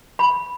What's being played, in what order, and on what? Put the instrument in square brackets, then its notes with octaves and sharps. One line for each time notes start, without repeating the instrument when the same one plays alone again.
[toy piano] B5